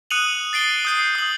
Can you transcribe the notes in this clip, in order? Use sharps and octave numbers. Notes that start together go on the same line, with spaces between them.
D#6 F#6 C#7 D#7 F7 F#7
A6 C7 D7 G7
D#6 G6 C7
D#6 F#7